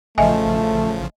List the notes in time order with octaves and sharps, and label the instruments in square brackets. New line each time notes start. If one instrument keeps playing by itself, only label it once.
[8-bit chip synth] A1 C#3 F3 [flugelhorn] A3 [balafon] D#5 E5 G#5